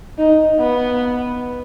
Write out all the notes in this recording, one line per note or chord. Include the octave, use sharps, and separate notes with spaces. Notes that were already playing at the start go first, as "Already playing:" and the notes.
D#4
B3